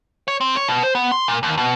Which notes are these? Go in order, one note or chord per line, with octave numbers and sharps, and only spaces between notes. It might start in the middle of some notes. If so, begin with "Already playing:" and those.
C#5
C4
C#5
B2
C5
B3
C6
A#2
D#2
B2